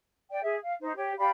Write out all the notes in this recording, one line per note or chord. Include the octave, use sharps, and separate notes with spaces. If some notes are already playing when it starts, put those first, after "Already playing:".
D5 G5
G#4 E5
F5
D#4 C5
G4 C#5
G4 D5 F5 B5